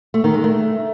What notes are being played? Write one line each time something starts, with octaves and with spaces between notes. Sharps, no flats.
A3
D#3
G#3
A3